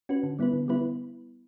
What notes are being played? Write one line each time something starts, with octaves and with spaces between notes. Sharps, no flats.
C#4 F#4 B4
D3
G3 B3 E4 B4
D3
G3 B3 E4 B4